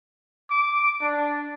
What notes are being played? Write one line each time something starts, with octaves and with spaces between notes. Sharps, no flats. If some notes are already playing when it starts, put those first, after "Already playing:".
D6
D4